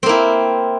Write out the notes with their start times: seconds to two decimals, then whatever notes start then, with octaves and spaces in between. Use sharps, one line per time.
0.03 C4
0.06 A#3
0.09 E4